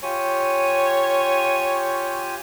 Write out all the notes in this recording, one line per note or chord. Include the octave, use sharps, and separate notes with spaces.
F4 G4 C#5 G#5